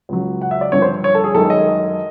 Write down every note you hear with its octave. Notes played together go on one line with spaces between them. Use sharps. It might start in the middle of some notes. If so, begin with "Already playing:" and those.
C#2 C#3 F#3
F#5
E5
D5
G2 D3 F3 C#5
C5
C#5
A4
G#4
F#2 D#3 G#3 A4
D#5